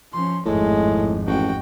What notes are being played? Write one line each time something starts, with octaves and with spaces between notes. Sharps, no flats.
F3 C#4 C6
G#1 F2 A2 G#3
A1 F#4 G5